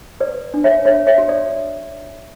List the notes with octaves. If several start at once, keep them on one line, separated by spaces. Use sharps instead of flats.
B4 D5
D4
C#5 E5
C#5 E5
C#5 E5
F#4
D5